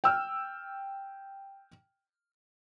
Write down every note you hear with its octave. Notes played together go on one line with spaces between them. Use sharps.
G5 E6 F6